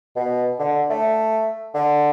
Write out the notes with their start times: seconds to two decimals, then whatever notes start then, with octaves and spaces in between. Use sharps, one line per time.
0.16 B2
0.59 D3
0.90 A3
1.74 D3